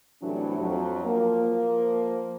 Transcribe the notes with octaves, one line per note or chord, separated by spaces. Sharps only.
A2 C3 E3 F#3 G3 D4
F2 F#3
F3 A#3